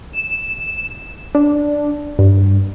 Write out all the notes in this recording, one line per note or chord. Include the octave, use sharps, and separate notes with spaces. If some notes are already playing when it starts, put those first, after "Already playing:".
E7
D4
G2